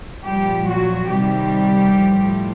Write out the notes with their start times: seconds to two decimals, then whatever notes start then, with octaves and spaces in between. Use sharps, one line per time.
0.24 A#2 F3 G3 G4
0.67 F#3 F#4
1.10 C3 D#3 G3 G4
1.97 A2 F3